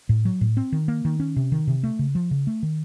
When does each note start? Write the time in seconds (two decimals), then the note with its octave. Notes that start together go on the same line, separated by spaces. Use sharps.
0.09 A2
0.25 F#3
0.41 A2
0.57 C4
0.72 D#3
0.88 A#3
1.05 D#3
1.20 C#4
1.36 C3
1.52 D#3
1.67 C3
1.83 A3
1.99 C#3
2.15 F3
2.31 C#3
2.47 A3
2.63 D#3